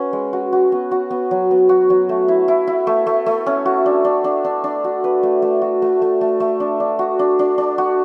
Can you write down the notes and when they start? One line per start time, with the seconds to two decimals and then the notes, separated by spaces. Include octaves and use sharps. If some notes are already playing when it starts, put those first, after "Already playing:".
Already playing: C#4 F#4 B4
0.13 G#3
0.33 F#4
0.53 F#4
0.72 B3
0.91 F#4
1.11 B3
1.31 F#3
1.51 B3
1.69 F#4
1.90 F#3
2.09 A3
2.28 E4
2.48 E4
2.67 E4
2.87 A3
3.07 A3
3.26 A3
3.46 C#4
3.66 F#4
3.86 D4
4.05 D4
4.24 D4
4.44 D4
4.64 D4
4.84 F#4
5.04 B4
5.23 A3
5.42 A3
5.62 F#4
5.82 A3
6.02 A3
6.21 A3
6.40 A3
6.60 D4
6.80 D4
6.99 F#4
7.19 D4
7.39 D4
7.58 D4
7.78 F#4